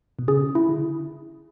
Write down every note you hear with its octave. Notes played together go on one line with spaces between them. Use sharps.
B2
C#3 G#4
E4
D3